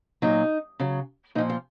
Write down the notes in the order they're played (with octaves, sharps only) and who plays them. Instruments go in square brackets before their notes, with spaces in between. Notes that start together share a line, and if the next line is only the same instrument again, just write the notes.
[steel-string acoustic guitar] A#2 F#3 D#4
C#3 F#3
A#2 D#4
F3
F4